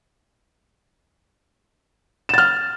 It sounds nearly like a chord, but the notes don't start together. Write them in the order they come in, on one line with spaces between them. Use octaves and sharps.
E7 A6 F6